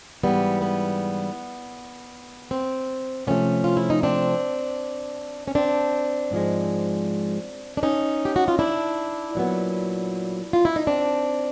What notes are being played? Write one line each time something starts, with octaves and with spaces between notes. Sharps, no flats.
G#2 E3 G3 B3
B3
C4
C3 F3 A3 B3 C#4
F4
E4
D#4
C4 D4
C#4
C4 D4
G#2 F3 G#3
D4
C#4 D#4
G4
F#4
F4
D4 E4
A#2 F#3 B3
F4
E4
D#4
C4 D4